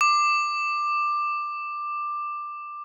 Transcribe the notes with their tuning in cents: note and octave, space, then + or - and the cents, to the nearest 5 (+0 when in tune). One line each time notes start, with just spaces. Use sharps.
D6 +15